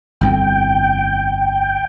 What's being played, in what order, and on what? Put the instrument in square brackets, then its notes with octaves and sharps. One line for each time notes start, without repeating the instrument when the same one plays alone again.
[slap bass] G1 C2 F2 [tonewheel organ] G5